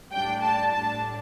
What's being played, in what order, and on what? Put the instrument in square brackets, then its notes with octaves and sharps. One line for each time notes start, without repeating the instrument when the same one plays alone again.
[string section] A2 G3 D4 G5
A5
A2 G3 D4 A5